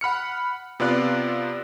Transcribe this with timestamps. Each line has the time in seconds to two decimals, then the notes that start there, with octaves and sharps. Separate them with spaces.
0.01 F#5 B5 F6 C#7
0.80 C3 B3 F4 D5 F#6